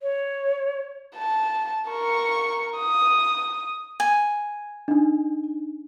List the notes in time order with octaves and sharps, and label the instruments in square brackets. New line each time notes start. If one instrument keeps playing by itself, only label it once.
[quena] C#5
[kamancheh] A5
A#4 C#6
D#6
[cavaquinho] G#5
[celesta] D4 D#4